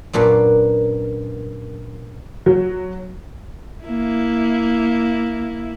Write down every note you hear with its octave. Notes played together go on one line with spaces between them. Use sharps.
F#2 A#2 D4 B4
F#3
A#3 E4